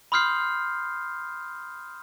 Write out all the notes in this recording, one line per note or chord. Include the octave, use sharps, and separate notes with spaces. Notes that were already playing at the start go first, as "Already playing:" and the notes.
B5 C6 D#6 F6 G6 C7